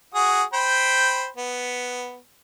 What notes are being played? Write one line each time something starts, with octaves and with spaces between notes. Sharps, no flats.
F#4 G#4 D#6
C5 G5 B5
B3